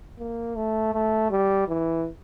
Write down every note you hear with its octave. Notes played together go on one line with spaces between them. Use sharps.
A#3
A3
A3
G3
E3